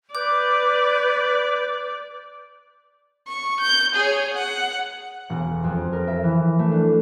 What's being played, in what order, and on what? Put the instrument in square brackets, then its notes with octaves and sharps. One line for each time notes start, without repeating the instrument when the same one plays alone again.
[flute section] B4 F#6 G6 [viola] D5 [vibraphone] D6
[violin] C#6
G6
G#4 C#5
F#5
[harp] E1
F2
A#4
E5
E3
A3
D4